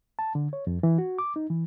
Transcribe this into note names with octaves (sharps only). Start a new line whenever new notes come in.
A5
D3
C#5
F2
E3
F#4
D6
D#4
E3